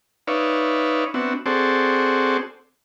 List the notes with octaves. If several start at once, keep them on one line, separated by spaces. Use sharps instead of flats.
D#4 B4 C#5 D5 E5 F5
B3 C4 D4 F#4 E5
C4 F#4 G#4 A4 C5 D5